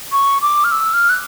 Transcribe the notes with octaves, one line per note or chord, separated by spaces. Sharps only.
C#6
D6
F6
E6
F6
F#6